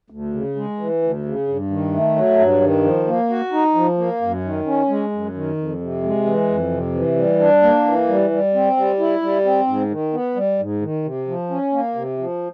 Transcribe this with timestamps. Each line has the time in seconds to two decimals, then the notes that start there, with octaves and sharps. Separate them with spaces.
0.10 D2
0.34 C#3
0.56 G#3
0.79 E3
1.02 D2
1.25 C#3
1.48 G2
1.70 D#3
1.93 A3
2.16 F#3
2.39 G2
2.61 D#3
2.84 F3
3.07 A#3
3.29 F#4
3.52 D#4
3.75 F3
3.98 A#3
4.21 F#2
4.44 D#3
4.66 C#4
4.89 G#3
5.12 F#2
5.34 D#3
5.58 F2
5.81 C3
6.03 G#3
6.25 E3
6.49 F2
6.71 C3
6.94 E3
7.16 G3
7.39 D4
7.62 A#3
7.85 E3
8.08 G3
8.30 G3
8.54 C4
8.77 G3
8.99 E4
9.22 G3
9.45 C4
9.67 G#2
9.90 D#3
10.13 B3
10.36 G3
10.59 G#2
10.82 D#3
11.04 C3
11.27 F3
11.50 C#4
11.73 A#3
11.95 C3
12.18 F3